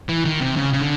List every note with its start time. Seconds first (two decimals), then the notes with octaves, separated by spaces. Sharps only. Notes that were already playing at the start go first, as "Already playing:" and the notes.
0.09 E3
0.25 D#3
0.41 C3
0.57 C#3
0.73 C#3
0.81 D3